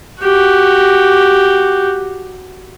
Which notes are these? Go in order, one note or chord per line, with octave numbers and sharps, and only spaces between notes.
F#4 G4